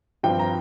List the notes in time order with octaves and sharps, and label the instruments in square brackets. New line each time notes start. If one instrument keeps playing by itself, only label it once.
[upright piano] G2 F3 C4 G5
A#5